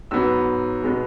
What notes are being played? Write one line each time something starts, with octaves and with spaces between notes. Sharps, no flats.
G#2 F#3 B3 E6
B2 G#3 B3